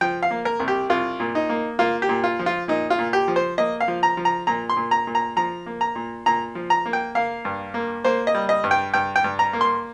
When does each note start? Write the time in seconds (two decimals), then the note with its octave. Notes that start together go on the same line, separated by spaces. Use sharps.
0.01 F3 G5
0.23 F5
0.31 A#3
0.45 A#4
0.60 C2
0.68 G4
0.90 C2 F4
1.20 A#2
1.35 D#4
1.49 A#3
1.79 A#3 F4
2.02 G4
2.09 A#2
2.24 F4
2.39 F3
2.46 F4
2.68 A#2 D#4
2.90 F4
2.99 A#2
3.13 G4
3.28 F3
3.36 C5
3.58 A#3 D#5
3.80 F5
3.88 F3
4.03 A#5
4.17 F3
4.25 A#5
4.47 A#2 A#5
4.70 C6
4.77 A#2
4.91 A#5
5.07 A#2
5.15 A#5
5.36 F3 A#5
5.66 A#3
5.81 A#5
5.95 A#2
6.26 A#2 A#5
6.55 F3
6.70 A#5
6.86 A#3
6.93 G5
7.15 A#3 F5
7.45 G2
7.74 A#3
8.04 A#3 C5
8.27 D#5
8.34 G3
8.49 D#5
8.64 G2
8.71 G5
8.94 G2 G5
9.16 G5
9.24 G2
9.39 A#5
9.53 A#3
9.61 C6